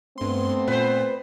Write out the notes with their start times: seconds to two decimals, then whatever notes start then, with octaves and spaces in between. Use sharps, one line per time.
0.18 G2 A3 B3 C4 C6
0.68 A#2 B4 C5